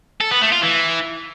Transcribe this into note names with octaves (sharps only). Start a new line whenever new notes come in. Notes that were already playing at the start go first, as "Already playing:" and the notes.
A4
B3
A3
F4
E3